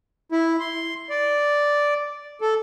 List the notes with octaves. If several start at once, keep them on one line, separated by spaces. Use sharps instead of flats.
E4
C6
D5
A4